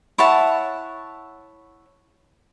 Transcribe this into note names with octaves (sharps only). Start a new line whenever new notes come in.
E4 C#5 F#5 A5